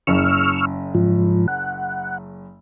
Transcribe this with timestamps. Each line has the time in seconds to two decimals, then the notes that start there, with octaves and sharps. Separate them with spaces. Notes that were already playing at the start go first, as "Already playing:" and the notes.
0.07 F#1 C#3 C#6 E6 F6
0.95 G#2 F3
1.48 F#5